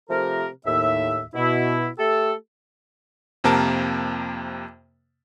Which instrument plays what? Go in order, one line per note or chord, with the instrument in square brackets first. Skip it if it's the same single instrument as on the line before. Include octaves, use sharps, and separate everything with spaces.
[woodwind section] C3 F3 A3 G4 A#4
D#2 A2 E5
B2 E4
A3 G4 A4
[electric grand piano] F2 C3 A#3 A#4 A5